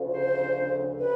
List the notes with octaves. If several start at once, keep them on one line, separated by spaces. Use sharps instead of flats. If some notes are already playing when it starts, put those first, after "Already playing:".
Already playing: D2 C#3 F3
C5
C3 B4